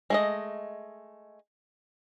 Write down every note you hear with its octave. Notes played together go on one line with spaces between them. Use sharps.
G#3 A3 D#5